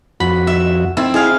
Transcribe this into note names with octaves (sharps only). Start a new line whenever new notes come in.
F2 F#4 B5
E5
C4 E4
E4 G#4 F5